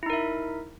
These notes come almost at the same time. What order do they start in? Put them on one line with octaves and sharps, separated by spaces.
E4 D#4 A#4 E5